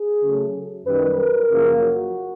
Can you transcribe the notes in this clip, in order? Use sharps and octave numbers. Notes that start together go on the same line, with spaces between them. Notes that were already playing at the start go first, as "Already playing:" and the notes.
Already playing: G#4
C#3 F#3 A3
F#2 D#3 G3 B4
A#4
F#2 C#3 F3 A#3
F#4